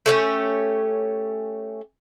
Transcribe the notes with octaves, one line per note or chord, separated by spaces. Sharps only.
A3 C#4 F4 G4